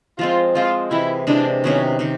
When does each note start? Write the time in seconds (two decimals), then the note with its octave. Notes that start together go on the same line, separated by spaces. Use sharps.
0.19 F3 G#3 C4 F4
0.55 F3 G#3 C4 F4
0.91 C3 E3 G#3 E4
1.27 C3 E3 G#3 D4
1.63 C3 D#3 F#3 B3 C#4
1.99 C3 D#3